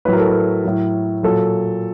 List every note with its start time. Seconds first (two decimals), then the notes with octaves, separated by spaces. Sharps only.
0.05 A2 F#3 B4
0.13 A#4
0.20 A4
0.28 A#4
0.65 A2 F#3
1.23 A#2 F#3 A4